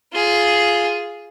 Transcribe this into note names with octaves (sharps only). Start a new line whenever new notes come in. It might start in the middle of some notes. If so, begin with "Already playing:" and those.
F4 G#4